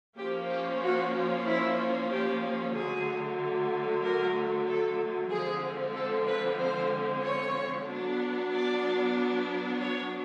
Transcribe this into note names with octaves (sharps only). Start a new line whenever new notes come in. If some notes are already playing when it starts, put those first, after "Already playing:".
F3 A#3 C#4 G4
G4
F#4
E4
G4
D3 F#3 A3 G#4
A#4
A4
D3 F3 G#3 C4 G#4
A4
B4
C5
C#5
F#3 B3 D4
D5
C#5